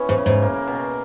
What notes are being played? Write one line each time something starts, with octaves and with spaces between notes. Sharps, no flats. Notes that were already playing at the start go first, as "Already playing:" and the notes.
Already playing: E3 B3 C#4
G#2
C#3
G#2
A#3
B2